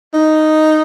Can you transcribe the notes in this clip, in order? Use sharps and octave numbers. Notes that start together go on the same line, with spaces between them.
D#4